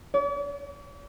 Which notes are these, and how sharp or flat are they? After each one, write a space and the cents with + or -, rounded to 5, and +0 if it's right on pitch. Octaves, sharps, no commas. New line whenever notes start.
D5 -45